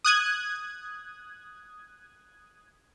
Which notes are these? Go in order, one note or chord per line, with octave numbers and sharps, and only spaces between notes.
D#6 F#6 G#6